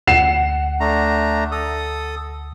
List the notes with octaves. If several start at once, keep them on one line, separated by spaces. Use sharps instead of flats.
D2 F#5 C7 E7
A3 D4 A#5
A4 D#6